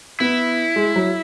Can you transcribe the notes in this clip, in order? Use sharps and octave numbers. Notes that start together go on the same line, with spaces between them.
B3 E4
G#3
F#3